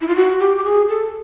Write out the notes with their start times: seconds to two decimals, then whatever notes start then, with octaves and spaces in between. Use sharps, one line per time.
0.01 E4
0.08 F4
0.16 F#4
0.40 G4
0.57 G4
0.65 G#4
0.89 A4